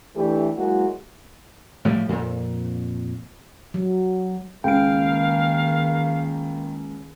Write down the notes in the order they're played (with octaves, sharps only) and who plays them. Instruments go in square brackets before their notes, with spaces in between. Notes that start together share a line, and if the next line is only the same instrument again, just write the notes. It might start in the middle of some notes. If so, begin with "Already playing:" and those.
[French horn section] E3 A3 D4 G4
F#3 G#3 A#3 E4 F#4
[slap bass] A2 F3 G3
F2 A#2
[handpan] F#3
[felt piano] C#2 [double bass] D#3 A#3 [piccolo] F5 [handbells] G5 D7